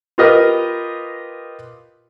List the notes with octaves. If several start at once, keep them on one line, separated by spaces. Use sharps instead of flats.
F4 G4 A#4 B4 D#5 F6